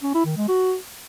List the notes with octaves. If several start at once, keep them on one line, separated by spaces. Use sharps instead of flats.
C#4
E4
D#3
G#3
F#4